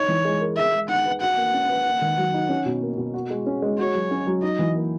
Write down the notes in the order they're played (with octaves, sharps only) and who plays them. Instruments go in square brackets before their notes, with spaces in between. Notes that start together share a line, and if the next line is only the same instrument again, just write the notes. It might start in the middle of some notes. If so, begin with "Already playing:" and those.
Already playing: [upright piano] D#4 [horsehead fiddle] C#5
[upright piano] E3
G#3
A#4
[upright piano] G#4 [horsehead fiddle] E5
[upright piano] G#3
[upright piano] D#4 [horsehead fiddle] F#5
[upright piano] B4
[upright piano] F#4 [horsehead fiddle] F#5
[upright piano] A#3
C#4
B4
A#3
D#3
F#3
D#4
C#4
B2
A#3
B2
F#4
G#3
C#4
G#3
[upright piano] F#4 [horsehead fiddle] C#5
[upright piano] F#3
C#4
F#3
[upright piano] D#4 [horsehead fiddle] D#5
[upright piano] E3
A#3